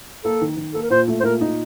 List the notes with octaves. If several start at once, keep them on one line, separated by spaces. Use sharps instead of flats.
A#3 A4
D#3
D#3
A#3 A4
A#4
A#2 C5
A3
C5
A#2 A#4
D#4